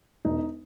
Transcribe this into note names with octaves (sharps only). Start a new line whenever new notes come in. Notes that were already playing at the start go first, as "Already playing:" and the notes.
E1 D#4